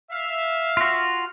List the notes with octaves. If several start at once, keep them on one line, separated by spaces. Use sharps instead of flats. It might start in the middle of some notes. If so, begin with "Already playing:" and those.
E5 F5
F4 F#4